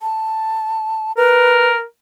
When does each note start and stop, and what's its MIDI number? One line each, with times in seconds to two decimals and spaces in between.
0.02 1.12 81
1.17 1.83 70
1.17 1.68 71